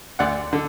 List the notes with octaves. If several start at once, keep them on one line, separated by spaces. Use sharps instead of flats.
D2 D5 F#5
D3